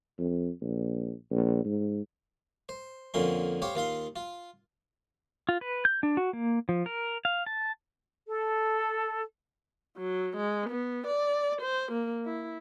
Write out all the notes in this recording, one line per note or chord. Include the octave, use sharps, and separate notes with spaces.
F2
A#1
A#1
G#2
C5
F2 A#2 D3 C#4 C6
G4 C5 C#5 F5
D#2 F4 F5 C6
F4
F4
B4
G6
D4
F#4
A#3
F3
A#4
F5
A5
A4
F#3
G#3
B3
D5
C5
A#3
E4